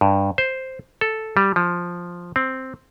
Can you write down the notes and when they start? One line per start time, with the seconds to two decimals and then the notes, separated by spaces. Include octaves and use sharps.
0.01 G2
0.38 C5
1.01 A4
1.37 G3
1.56 F3
2.36 C4